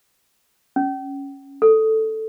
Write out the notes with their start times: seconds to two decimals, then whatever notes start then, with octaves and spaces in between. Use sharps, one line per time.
0.76 C#4
1.62 A4